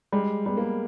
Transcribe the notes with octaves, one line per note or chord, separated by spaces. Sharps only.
G3 G#3
G3 B3
A#3